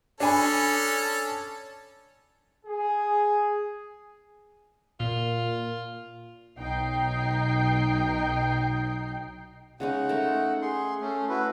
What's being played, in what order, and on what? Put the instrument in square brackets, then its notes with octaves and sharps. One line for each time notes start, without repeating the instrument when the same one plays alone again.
[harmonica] C#4 A4 [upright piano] D4 G#5 B5
[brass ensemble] G#4
[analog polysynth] A#2 [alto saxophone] F4
[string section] B1 D#4 G5 C7
[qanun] C#3 G#3 C#4 [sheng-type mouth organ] D#4 F#5
[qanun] A3 A#4
[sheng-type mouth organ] G#4 C6
A3 C#4
E4 F#4 B4